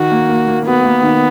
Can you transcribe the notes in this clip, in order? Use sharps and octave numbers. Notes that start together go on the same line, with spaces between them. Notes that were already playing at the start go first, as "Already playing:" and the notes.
Already playing: D#3 F#4
A#3
A#3
A#3
B3 F#4
A#3
D#3